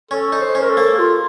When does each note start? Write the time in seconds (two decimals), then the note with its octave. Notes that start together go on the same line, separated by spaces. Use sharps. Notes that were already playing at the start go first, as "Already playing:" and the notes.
0.11 C#4 A4
0.32 D#4
0.40 C5
0.55 C#4
0.62 A#4
0.69 A4
0.77 A#3
0.98 F4